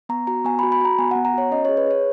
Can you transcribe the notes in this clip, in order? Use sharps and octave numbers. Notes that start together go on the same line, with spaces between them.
B3 A#5
F#4 A#5
B3 G#5
B5
F#4
B5
F#4 A#5
B3 G#5
F#5
B3
A#5
F#4 C#5
C#4 D#5
C#5
G#4
B4
G#4 C#5